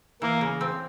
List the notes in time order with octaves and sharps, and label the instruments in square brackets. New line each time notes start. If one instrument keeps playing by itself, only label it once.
[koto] E3 [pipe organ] A#3
[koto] C#3
C4